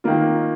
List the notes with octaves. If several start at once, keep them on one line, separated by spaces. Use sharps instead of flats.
D#3 A#3 F4